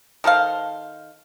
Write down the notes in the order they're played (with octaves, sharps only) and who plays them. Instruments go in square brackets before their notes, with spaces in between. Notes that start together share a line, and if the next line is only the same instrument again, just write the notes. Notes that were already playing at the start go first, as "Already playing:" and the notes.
[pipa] D#3 A4 C5 F5